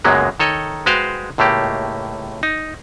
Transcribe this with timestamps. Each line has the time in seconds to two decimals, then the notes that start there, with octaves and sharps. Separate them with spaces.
0.04 C#2 F#2 F#3 G#3 A#3 B3
0.40 D#3 A4 C#5 D#5
0.86 G#3 F#4 B4 C5 F5 G5
1.38 C#2 A2 A3 A#3 G4
2.43 D#4